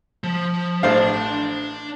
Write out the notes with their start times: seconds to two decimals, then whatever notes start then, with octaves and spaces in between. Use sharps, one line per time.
0.24 F3
0.83 A1 D4 C5 F5 A5